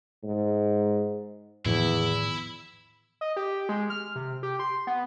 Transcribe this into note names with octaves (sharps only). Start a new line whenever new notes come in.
G#2
E2 A2 D#3 F3 E4
D#5
G4
G#3
F6
C3
G4
C6
B3